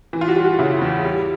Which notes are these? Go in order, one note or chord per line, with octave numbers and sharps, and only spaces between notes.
E3
F4
F#4
G3
F#4
C#3 E4
E2
G3